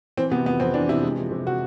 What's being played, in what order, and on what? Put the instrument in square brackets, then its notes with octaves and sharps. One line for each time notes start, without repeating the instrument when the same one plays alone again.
[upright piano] E3 C4
C3 B3
F2 B3
F2 C4
E3 D4
C3 E4
G#3
F3
C3
C3 F#4